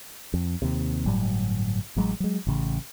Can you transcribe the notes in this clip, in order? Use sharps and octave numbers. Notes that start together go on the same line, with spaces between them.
F2
D#2 C3
G1 A2 F#3 G3
A1 F#3 G#3
F#3 G#3
A1 C#3